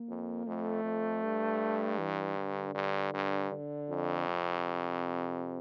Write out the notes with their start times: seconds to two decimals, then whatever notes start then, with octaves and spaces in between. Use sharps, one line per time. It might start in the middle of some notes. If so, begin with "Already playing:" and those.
Already playing: A#3
0.09 F2
0.46 F2 A3
0.84 F2
1.23 G2
1.99 E3
2.37 D3
2.75 G2
3.14 G2
3.51 D3
3.90 F2
4.28 C3